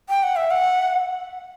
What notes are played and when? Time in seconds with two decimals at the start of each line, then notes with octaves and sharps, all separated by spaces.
0.09 G5
0.23 F#5
0.36 E5
0.51 F#5